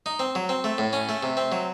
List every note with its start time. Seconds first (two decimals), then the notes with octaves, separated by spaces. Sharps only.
0.06 D#4
0.19 C4
0.35 F#3
0.49 C4
0.64 A3
0.78 A2
0.93 C#4
1.09 A3
1.23 C3
1.37 C4
1.52 F#3